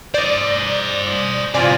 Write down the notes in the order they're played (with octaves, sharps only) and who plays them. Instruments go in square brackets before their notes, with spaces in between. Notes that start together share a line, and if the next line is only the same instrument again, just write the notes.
[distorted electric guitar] C5 D#5 [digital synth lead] D5
[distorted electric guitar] C3 E3 [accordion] C4 F4 G#5 [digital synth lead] D5